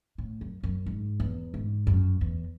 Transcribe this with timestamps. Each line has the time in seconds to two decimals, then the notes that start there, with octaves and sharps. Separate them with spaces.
0.18 A2
0.41 F#2
0.63 F#2
0.86 G#2
1.20 E2
1.54 G#2
1.87 F#2
2.21 E2